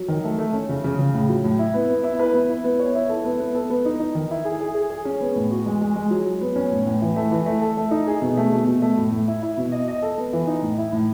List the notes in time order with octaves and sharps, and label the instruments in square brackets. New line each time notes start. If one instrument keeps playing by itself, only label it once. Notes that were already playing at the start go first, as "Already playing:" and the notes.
Already playing: [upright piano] F#3
D#3
A3
A3
C#4
C#3
C#3
C#3
A2
F#3
A2
E4
B3
B3
E4
B4
B3
E4
B3
C#5
E4
A4
B3
B3
A4
B3
D#4
D#4
D#3
E4
G#4
G#4
G#4
G#4
C#4
B3
A2
F#4
G#3
G#3
G#3
F#3
F#3
B3
C#4
A2
A2
E3
A3
E3
A3
A4
A3
D#4
G#4
B2
A3
B2
B2
A3
A2
A2
E4
E4
B2
D#5
D#5
A4
B3
E3
D#4
A2
E4
A2